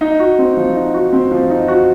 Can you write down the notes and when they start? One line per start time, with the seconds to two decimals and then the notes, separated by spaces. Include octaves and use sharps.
0.01 D#4
0.19 F#4
0.39 C4
0.57 F3
0.76 D#4
0.94 F#4
1.13 C4
1.31 F3
1.50 D#4
1.68 F#4